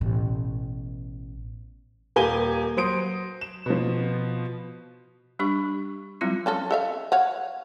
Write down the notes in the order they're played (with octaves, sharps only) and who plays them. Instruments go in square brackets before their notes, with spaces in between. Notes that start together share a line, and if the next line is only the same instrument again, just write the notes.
[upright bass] A1 B2
[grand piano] D#1 A#3 G4 G#5 D#7 G7
F#3 C5 D#6 D7
E7
B2 F3
[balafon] G3 D4 G4 C#6
F#3 G3 C4 E4 F4
[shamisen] F3 C#4 A4
A4 E5 F5
C#5 F5 F#5